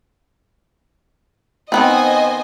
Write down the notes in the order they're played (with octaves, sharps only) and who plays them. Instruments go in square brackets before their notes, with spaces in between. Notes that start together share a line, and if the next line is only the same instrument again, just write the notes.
[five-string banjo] D#3 B3 C4 [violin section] C5 D#5 G#5